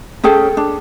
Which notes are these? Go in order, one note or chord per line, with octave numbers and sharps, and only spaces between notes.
C#4 G#4 A4 G5
D4